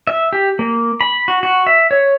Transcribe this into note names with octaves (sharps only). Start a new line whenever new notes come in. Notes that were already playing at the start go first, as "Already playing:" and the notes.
E5
G4
A#3
B5
F#4
F#4
E5
C#5